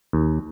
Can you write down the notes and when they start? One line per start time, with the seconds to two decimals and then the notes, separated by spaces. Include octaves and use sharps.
0.13 D#2